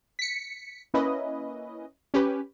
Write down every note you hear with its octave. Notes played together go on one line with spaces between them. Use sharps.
B6 C#7
A#3 C#4 E4 B4 D#5
C#4 G4 B4